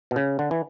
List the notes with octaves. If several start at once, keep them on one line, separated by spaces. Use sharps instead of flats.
B2
C#3
D3
E3